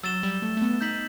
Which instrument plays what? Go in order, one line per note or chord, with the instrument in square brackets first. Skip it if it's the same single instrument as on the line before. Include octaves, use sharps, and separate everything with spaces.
[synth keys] F#3 [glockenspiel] E6 A6 E7 G7
[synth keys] G3
A3
A3
B3
[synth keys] D#4 [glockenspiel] G6 B6 F#7